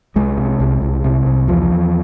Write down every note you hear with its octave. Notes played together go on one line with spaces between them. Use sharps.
C2 G#3
C3
C2
C2
C3
C2
E2 F3
E2